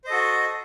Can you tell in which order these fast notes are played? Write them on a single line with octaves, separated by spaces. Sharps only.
C5 D#5 A4 F#4